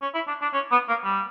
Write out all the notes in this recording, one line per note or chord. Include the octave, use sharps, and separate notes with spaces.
C#4
E4
D4
D4
C#4
B3
A#3
G3